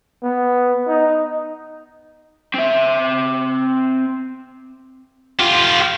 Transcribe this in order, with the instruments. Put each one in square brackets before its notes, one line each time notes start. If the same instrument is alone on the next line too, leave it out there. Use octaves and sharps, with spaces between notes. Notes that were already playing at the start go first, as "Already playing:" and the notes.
[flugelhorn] B3
D#4
[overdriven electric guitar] C4 E5
[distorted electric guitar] F4 G4